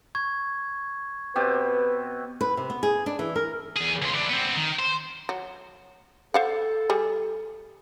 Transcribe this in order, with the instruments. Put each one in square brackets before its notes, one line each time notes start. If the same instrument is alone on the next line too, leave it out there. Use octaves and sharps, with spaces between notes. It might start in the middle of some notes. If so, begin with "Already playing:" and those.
[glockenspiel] C#6 G#6
[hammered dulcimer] B2 C4 G4 [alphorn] B4
[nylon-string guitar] B4
C3
B3
G#4
D4
E3
A#4
[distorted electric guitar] E2 G#4
C#2 F4
E3 D4
B3 C4
D#3
C5
[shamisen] F#3
[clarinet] A4 [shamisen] C5 F5 F#5
[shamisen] G3 G#4